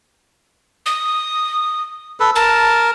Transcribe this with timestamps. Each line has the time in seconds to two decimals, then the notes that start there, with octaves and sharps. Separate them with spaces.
0.86 D#6
2.20 A4 B4
2.36 A#4 A5